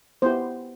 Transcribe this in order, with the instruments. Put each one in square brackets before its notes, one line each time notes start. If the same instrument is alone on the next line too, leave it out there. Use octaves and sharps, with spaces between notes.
[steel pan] B3 E4 G4 C5